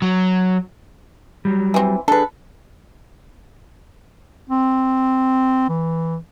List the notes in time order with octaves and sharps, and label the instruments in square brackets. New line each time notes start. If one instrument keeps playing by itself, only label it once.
[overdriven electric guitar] F#3
[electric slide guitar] F#3 G3
[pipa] E3 C4
[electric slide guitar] D4 G#4 [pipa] A4 B4
[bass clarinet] C4
E3